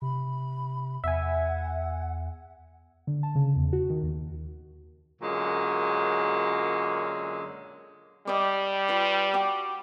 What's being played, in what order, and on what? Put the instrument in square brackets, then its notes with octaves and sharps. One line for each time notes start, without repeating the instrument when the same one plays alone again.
[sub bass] C3 [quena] B5
[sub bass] E2 [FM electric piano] E5 G#5 [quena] F#5
[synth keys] D3
A5
C#3
E2
F#4
D#3
D#2
[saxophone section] F#2 A#2 D3 F#3 G#3
[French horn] G3 [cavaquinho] D5 D#5
[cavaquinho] F4 G4 B4
F#4 G4 D6